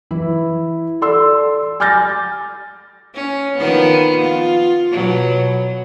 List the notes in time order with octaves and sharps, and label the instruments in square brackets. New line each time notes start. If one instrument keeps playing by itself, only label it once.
[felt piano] E3 E4
A4 D5 C6 E6
G#5 D6 F6 G6 A6 A#6
[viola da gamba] C#4
D#3 F3 B3
F4
B2 F#3